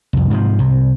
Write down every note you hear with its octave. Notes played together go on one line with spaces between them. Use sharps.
C2 F2
G#2 C3 F3
C2 C3